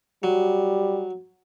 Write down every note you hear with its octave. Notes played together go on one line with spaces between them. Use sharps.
F#3 G3